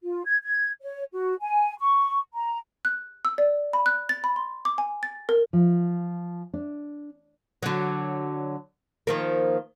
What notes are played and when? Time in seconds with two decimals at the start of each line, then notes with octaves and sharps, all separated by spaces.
0.03 F4
0.26 G#6
0.42 G#6
0.82 C#5
1.12 F#4
1.42 G#5
1.79 C#6
2.33 A#5
2.85 F#6
3.25 E6
3.38 D5
3.73 B5
3.86 F#6
4.09 A6
4.24 B5
4.36 C6
4.65 D6
4.78 G#5
5.03 A6
5.29 A#4
5.53 F3
6.54 D4
7.63 D3 F#3
9.07 D#3 F3 A#3